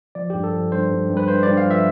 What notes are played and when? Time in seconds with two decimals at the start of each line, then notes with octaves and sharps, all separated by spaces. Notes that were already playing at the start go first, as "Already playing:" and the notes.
0.15 F3 D5
0.30 G2 G4
0.44 A4
0.53 F3
0.72 G2 C5
0.91 G2
1.09 G2
1.17 B4
1.28 G2 C5
1.43 G2 D5
1.57 F5
1.66 F3 E5